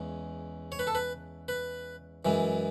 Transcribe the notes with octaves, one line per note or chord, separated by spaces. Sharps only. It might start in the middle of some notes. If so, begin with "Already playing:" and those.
Already playing: E2 C#3 G#3
C#5
B4
A4
B4
B4
F#2 E3 G#3